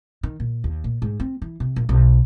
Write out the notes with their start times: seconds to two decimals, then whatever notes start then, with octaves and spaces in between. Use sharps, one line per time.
0.23 D#3
0.40 A#2
0.64 D#2
0.84 A#2
1.02 G#2
1.20 C4
1.42 E3
1.60 C3
1.76 A#1
1.89 B1